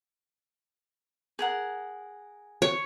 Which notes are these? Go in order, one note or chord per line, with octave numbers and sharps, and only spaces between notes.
G#4 A#4 F#5
C#5